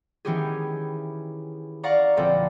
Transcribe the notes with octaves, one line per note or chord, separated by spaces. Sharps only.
D#3 E3 B3 C#4 G4 G#4
D5 F5 F#5 A#5 C#6
A#1 D3 C4 A4 D5 A#5